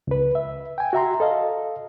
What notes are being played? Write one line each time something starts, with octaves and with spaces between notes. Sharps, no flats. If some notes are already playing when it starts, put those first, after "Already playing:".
C#2 B4
E5
G5 G#5
F#4 E5 A#5 C6
A4 D#5 F5